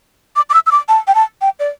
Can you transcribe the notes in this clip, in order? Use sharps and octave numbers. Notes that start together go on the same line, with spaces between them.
D6
D6
E6
E6
D6
A5
G5
A5
G5
D5